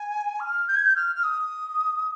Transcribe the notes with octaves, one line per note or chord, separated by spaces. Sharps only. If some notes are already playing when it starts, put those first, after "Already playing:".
Already playing: G#5
F6
G6
G#6
G6
F6
F6
D#6